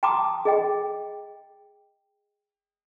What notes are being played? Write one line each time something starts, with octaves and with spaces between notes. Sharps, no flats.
G5 A5 A#5 C6 D6 D#6
G#4 D#5 G5